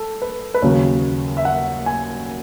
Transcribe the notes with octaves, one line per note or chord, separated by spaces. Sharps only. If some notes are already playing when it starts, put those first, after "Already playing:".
Already playing: A4
B4
B4
D#2 C#3 F#3 C#5
E5
F#5
G#5